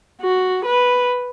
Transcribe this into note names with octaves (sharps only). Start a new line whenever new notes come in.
F#4
B4